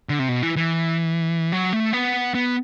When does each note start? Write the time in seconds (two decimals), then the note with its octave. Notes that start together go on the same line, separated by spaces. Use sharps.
0.09 D3
0.19 C3
0.29 B2
0.43 E3
0.56 E3
1.52 F#3
1.73 A3
1.93 B3
2.34 B3